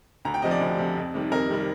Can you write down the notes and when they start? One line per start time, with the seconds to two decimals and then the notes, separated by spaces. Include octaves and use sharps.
0.25 D2 A#5
0.34 G5
0.42 C3 F3 D#5
0.51 D5
0.61 D2
0.78 C3 F3
0.96 F2
1.14 C3 D#3 G3
1.31 F2 A#4
1.49 C3 D#3 G3